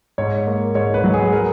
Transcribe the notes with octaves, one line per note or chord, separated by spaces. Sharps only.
G#2 C#5
A#3
G#2 C#5
B4
F#3
G#4
A#4